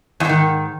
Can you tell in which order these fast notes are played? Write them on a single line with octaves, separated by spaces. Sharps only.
E2 G#2 D#3